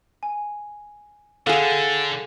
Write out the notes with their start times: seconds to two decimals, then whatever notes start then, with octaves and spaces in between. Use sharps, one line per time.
0.23 G#5
1.46 D3 G#4 A4 F5 F#5 F6